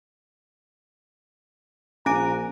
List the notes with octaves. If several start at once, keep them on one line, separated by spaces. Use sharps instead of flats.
A#1 C#4 G#5 A#5 D7